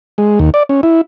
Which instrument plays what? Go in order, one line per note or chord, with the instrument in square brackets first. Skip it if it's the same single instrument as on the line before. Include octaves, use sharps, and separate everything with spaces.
[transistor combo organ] G#3
D#2
D5
C#4
E4